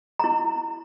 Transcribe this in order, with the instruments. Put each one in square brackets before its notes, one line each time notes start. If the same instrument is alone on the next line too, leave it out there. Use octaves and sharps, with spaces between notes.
[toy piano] E4 A#5